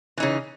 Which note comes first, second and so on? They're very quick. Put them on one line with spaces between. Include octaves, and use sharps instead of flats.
E3 D#4 C#3